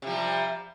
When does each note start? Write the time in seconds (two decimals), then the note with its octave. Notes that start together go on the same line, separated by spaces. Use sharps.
0.02 C3
0.07 F3
0.11 G3